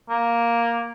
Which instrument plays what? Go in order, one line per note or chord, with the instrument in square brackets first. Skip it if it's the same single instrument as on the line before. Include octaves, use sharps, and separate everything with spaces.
[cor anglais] A#3